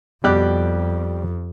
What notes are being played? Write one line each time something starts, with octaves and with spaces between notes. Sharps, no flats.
F2 B2 G3 G4 F#6